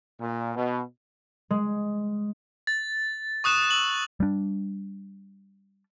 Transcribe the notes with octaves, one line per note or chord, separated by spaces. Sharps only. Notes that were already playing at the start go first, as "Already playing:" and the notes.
A#2
B2
G#3
A6
C#6 D#6 F#6 E7
E6 F#7
G3 D4